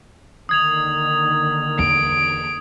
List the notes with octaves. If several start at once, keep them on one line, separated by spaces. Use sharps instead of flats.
D#2 D3 D#3 D#6 G#6 F7
E2 D7